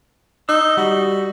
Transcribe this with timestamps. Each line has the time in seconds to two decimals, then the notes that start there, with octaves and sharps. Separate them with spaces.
0.49 D#4 E6
0.77 G3 F#4